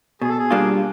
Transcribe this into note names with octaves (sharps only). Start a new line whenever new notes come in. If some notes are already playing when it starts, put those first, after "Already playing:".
B2 G#4
A4
G#4
G3 A#3 D4 F4